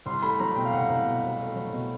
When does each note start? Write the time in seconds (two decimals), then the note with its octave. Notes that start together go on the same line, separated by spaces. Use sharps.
0.06 C2 C6
0.22 A3 B5
0.39 F#3 A#5
0.56 B2 G5
0.65 F5
0.73 C2 F#5
0.90 C2
1.06 B2
1.23 C2
1.40 A3
1.56 F#3
1.73 B2